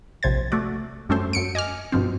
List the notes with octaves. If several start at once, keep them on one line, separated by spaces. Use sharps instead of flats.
A#1 C3 C5 G#6 A6
A3 F#4 D5
F#2 G3 A3 C#4 A4 C5
F#2 C#7 D7
D#5 G#5 D6 F6
G2 B2 F3 C4